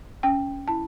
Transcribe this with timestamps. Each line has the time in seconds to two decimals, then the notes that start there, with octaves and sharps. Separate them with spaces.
0.23 C#4 G5
0.68 E4 A5